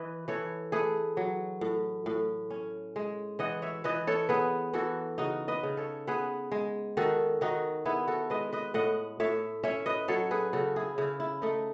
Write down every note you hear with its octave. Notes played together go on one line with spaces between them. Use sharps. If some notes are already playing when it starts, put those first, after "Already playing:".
Already playing: E3 B4 D#5
E3 A4 C#5
A3 G#4 B4
F#3
A2
A2
C#4
G#3
E3 D#5 F#5
C#5 E5
E3 B4 D#5
A4 C#5
B3 G#4 B4
E3 F#4 A4
C#3 D#4 F#4
B4 D#5
C#3
A4 C#5
B3 G#4 B4
G#3
D#3 F#4 A4
D#3 D#4 F#4
B3 E4 G#4
F#4 A4
G#3 B4 D#5
B4 D#5
A2 D#5 F#5
A2 C#5 E5
C#4 C#5 E5
B4 D#5
F#3 A4 C#5
G#4 B4
C#3 F#4 A4
E4 G#4
C#3 E4
E4
A3 D#4